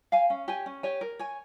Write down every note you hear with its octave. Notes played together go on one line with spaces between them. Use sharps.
F5 G#5
C#4
G4 C#5 G#5
C#4
G4 C#5 G#5
A#4
C#5 G#5